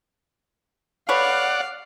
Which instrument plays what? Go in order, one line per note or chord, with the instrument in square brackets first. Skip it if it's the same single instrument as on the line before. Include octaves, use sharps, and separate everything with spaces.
[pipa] A4 B4 C#5 [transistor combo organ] D5 F#5 [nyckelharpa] F5